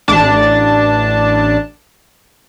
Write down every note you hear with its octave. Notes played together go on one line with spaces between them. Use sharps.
A1 D4 A5